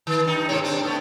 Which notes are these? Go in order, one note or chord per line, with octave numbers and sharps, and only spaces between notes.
D#3
G2 D#4
G#2 C3 C#5
C4 D4
A3 B3